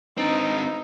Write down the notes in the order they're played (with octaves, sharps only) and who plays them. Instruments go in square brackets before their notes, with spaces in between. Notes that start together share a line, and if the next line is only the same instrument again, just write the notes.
[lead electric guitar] G#2 C4 [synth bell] D4 B4 [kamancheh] D#4